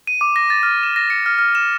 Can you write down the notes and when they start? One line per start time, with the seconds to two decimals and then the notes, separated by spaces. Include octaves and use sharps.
0.07 D#7
0.21 D6
0.36 A#6
0.50 A6
0.63 F6
0.83 E7
0.96 A#6
1.10 C#7
1.26 F6
1.38 F6
1.55 E7